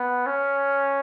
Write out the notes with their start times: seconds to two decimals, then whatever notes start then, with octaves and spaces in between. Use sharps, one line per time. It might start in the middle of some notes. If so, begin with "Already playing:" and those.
Already playing: B3
0.26 C#4